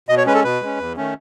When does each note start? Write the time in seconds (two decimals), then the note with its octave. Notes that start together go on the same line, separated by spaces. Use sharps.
0.09 B2 D#5
0.17 C#5
0.26 G#3 C#4 B4
0.35 A4
0.44 B2 B4
0.61 G#3 C#4
0.79 E2
0.97 D#3 A3 C#4